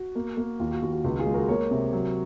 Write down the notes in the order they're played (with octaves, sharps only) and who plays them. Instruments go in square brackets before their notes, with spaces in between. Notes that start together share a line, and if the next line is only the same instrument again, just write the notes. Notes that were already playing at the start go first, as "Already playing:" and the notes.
Already playing: [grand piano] F#4
A#3
A#3
D#2 F4
F#4
D#2 F#4
F#4
C#2 F#4
F4 G#4
G#3
F#4 A#4
A#3 A#4 C#5
C3
F#3